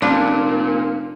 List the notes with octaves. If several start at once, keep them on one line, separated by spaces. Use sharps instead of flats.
F1 A#2 C#4 D4 F5 C6